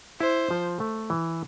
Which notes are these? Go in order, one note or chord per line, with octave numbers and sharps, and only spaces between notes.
E4 C5
F3
A3
E3